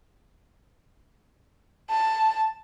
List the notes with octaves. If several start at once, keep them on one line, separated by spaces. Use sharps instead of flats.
A5